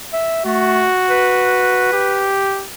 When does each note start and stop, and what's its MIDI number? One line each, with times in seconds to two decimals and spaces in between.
0.13 0.44 76
0.46 0.88 57
0.46 1.91 66
1.10 2.35 71
1.93 2.67 67